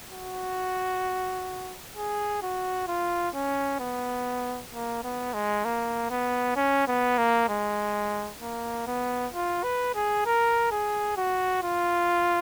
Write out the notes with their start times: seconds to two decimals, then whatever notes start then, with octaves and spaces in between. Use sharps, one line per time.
0.12 F#4
1.97 G#4
2.43 F#4
2.88 F4
3.34 C#4
3.80 B3
4.73 A#3
5.03 B3
5.34 G#3
5.65 A#3
6.10 B3
6.56 C#4
6.88 B3
7.18 A#3
7.49 G#3
8.41 A#3
8.87 B3
9.33 F4
9.64 B4
9.95 G#4
10.26 A#4
10.71 G#4
11.17 F#4
11.63 F4